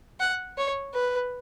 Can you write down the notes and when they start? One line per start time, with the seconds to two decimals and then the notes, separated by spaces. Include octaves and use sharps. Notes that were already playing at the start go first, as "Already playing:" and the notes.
0.20 F#5
0.58 C#5
0.94 B4